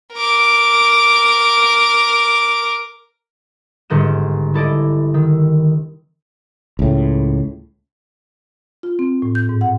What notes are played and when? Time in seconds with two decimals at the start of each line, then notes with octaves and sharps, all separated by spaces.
0.14 A#4 D6
3.90 G1 G#2 D3 D#4 E7
4.54 E4 A4 D5 D#5
5.14 D#3 E6
6.79 C#2 A2
8.83 F4
8.99 C4
9.22 A2
9.35 G6
9.49 G#2
9.61 F#5